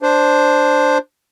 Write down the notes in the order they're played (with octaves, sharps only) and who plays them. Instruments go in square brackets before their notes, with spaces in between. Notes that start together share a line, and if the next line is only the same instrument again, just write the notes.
[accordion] D4 C5